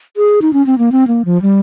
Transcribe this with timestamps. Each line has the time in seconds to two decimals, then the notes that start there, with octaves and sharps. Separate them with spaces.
0.17 G#4
0.42 D#4
0.53 C#4
0.66 C4
0.78 A#3
0.92 C4
1.08 A#3
1.25 F3
1.42 G3